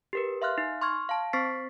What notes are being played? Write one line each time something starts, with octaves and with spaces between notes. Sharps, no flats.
G4 A#4 B4
E5 F5 C6 F6 F#6
D#4
C6 C#6 F6 G#6
F5 A5
C4 C5 C#6 A6 B6 C7